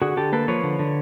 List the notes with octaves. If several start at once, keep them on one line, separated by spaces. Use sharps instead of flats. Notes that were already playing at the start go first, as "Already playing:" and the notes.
D3 F#4 G#4
D3 G4 A4
A#3 A4 B4
F3 B4 C#5
D3
D3